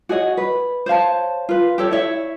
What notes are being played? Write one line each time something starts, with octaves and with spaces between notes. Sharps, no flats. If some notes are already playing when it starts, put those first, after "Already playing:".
F#4 G#4 C#5 D#5
B4
C5 C#5 F5 A5
F4 B4
G4 A4 C#5
E4 C#5 E5